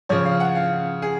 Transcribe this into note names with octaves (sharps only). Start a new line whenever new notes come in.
C#3 F3 C#5
F5
F#5
F5
G#4